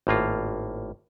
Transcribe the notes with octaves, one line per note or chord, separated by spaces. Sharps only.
G#1 A2 A#3 F4